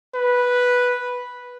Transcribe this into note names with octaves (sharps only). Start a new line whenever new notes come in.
B4